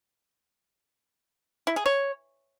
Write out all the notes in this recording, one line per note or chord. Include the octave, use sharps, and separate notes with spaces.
E4
G#4
C#5